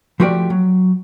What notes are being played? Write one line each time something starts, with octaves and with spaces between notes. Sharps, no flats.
F3 A3 F#4 G4 B4 D5
F#3